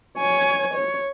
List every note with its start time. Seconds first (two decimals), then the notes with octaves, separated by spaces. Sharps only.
0.18 C#5 G#5
0.74 C#5